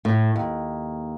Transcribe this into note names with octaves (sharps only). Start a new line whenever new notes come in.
A2
D#2